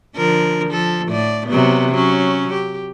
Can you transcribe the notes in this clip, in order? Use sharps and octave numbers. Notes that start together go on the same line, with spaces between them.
D3 F3 A#4
F3 A4
A2 D5
C3 F#3 B3
F#3 C#4
G4